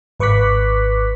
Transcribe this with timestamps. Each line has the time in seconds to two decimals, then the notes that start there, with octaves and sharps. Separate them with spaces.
0.20 G#1 B4 C#6 D6 F#6 B6